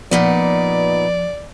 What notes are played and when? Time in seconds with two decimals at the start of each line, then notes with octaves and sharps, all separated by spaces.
0.11 A#2 F3 B3 D#4 D5